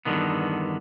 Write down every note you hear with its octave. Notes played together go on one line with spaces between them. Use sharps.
E2 G2 B2 D3 D#3 B3